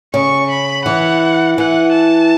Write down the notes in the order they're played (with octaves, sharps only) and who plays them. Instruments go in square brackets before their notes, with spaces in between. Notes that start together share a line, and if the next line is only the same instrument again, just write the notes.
[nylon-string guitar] C#3 [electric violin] C#6
[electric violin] B5
[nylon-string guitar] E3 [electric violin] F#5
[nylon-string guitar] E3 [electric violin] F#5
[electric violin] A5